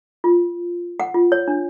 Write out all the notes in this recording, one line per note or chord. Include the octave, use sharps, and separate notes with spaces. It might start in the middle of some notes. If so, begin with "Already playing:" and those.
F4
F#5
F4
C#5
D4